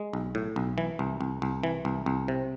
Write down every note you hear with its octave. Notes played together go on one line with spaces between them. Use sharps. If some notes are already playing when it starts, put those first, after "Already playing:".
Already playing: G#3
B1
A2
B1
E3
C2
C2
C2
E3
C2
C2
C3